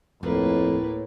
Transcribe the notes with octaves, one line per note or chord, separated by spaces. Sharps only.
D1 F2 A2 A#3 B4